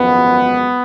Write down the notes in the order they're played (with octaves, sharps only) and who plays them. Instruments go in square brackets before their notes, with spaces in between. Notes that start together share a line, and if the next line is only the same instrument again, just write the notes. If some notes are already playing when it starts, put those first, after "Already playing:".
Already playing: [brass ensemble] G#1 F#2 F3 G#3 B3